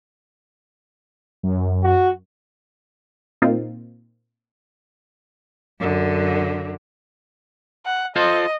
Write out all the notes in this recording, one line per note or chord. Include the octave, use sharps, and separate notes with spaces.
F#2
F#4
A#2 A#3 C4 D#4 F4
F#2 D3
F#5
F4 A4 C5 D#5